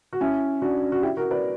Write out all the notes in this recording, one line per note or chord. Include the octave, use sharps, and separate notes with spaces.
F#4
C#4 E4
D4 F#4
F#4
E4 G4
F#4 A#4
B4 D5